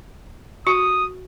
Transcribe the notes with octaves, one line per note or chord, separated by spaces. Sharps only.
F#4 D#6